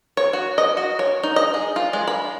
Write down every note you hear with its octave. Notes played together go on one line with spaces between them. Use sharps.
C#5
F#4
D#5
F#4
C#5
D#4
D#5
G#4
F4
G#3
B5